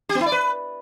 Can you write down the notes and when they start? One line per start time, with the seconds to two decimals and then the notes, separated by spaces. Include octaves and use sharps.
0.09 G4
0.15 B3
0.21 E4
0.26 D5
0.32 B4